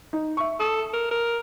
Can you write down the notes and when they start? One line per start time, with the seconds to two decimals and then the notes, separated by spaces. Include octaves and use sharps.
0.13 D#4
0.37 E5 C#6
0.60 A4 D#6
0.94 A#4
1.11 A#4